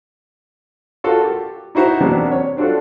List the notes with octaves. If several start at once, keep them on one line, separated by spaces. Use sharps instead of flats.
F4 F#4 A4 A#4
G4
D#4 E4 F#4 C5 A#5
E2 C3 F#3 A#3 B3 D4
C#5
C4 D4 F4 F#4 A4